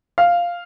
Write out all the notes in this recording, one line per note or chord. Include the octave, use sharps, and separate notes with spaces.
F5